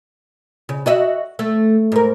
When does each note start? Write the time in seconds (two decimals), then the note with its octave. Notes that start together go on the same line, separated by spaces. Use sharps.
0.69 C#3
0.86 F#4 D#5 E5
1.39 A3
1.92 G#2 A#4